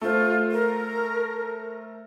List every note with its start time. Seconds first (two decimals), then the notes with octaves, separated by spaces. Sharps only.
0.01 A3 F4 C5
0.51 A#4